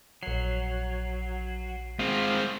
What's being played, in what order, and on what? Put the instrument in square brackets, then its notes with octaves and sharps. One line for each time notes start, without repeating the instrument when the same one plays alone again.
[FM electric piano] A#1 C7 [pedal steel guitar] F#3
[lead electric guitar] G#3 C4 [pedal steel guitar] F4